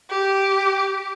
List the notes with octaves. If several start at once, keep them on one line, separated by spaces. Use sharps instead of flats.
G4